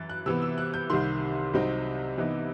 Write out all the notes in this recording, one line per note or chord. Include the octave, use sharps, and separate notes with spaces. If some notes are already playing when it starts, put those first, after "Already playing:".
Already playing: F#2 E3 A6
F#6
C3 E3 B3 E6
E6
F#6
G6
C2 C3 D#3 C6
C2 C3 F#3 C4 D#4
C3 E3 B3 D#4